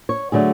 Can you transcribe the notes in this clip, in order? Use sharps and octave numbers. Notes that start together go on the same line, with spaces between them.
C#5
D3 F#3 A3 G#4